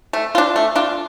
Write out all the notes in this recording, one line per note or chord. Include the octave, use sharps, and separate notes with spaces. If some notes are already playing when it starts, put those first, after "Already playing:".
A3
D4 F4
A3
D4 F4